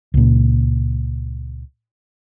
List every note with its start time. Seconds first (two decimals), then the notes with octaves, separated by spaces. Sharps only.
0.14 C#2 A#2